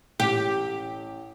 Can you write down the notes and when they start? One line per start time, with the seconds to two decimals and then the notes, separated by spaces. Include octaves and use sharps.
0.20 A1 G4